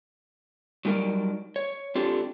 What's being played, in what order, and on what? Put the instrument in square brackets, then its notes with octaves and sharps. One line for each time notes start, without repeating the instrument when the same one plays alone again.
[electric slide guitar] F#3 G3 D#4 A#4 D5
C#5
C4 D4 F4 G4 A4